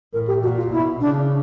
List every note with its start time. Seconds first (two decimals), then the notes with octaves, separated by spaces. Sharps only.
0.13 A2 A#4
0.27 G4
0.42 A#2 F#4
0.57 F4
0.72 B2 E4
1.00 C#3 D4